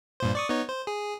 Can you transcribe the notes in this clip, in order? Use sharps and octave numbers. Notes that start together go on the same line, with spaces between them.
G2 A#2 C5
D5 C#6 D#6
B3 D#4 C#5
C5
G#4